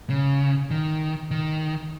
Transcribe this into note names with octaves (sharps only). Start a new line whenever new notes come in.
C#3
D#3
D#3